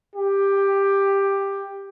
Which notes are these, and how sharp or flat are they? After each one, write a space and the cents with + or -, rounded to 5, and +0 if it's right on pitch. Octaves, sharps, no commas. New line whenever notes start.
G4 +10